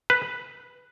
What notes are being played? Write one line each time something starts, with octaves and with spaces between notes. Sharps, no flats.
B4